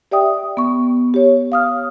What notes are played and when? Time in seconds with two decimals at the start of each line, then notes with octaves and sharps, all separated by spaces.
0.11 G4 D5 E5 G5 D#6
0.57 B3 C#6
1.14 G4 C#5
1.52 F5 D#6 F6